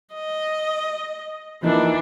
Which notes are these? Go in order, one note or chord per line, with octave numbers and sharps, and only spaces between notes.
D#5
E3 F3 A#3 D4 D#4